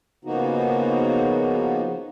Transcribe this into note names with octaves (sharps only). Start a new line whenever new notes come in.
C#3 F3 A#3 B3 D#4 F#4